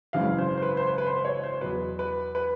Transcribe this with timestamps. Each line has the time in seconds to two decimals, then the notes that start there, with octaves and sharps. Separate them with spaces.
0.13 G#1 F#2 C#3 E3 F5
0.39 C5
0.58 C5
0.62 B4
0.77 C5
0.88 B4
0.98 B4
1.07 C5
1.25 C#5
1.44 C5
1.61 E2 B2 F#3 B4
1.99 B4
2.35 B4